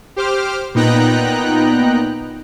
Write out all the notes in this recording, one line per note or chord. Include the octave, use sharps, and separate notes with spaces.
G4 C5 D6 F6
A#2 B3 D#4 G5 A#5 F#6